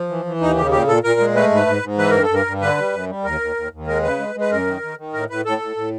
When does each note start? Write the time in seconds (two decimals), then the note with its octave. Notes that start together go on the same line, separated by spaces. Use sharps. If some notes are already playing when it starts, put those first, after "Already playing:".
Already playing: F3
0.09 E3
0.25 E3
0.41 D#2 D#4
0.56 C#3 G4
0.71 A#2 G4
0.87 A#2 A4
1.03 A#2 A#4
1.20 G#3
1.35 A3 B4
1.51 G#2 B4
1.66 G#2
1.83 G#2
1.98 E3 B4
2.10 G2 A#4
2.23 A4
2.29 G2
2.34 A#4
2.46 G2
2.61 D3 B4
2.77 G3
2.92 F#2
3.09 G3
3.24 D#2 A#4
3.41 D#2
3.56 D#2
3.72 D#2
3.87 G#3 A#4
4.03 C#3 B4
4.19 G#3
4.35 G#3
4.41 B4
4.51 F#2 A#4
4.67 D#3
4.82 D#3
4.98 D#3
5.13 A2 A#4
5.30 A2 B4
5.45 A2 A4
5.62 A2
5.76 A2